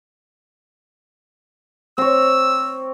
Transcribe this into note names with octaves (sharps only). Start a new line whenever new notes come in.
C4 C#5 E6